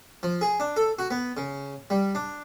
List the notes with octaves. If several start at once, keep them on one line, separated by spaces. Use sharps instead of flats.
F3
G#4
D4
A4
F#4
B3
C#3
G3
D4